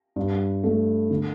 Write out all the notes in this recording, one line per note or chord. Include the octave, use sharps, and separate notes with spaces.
G2
A3
D3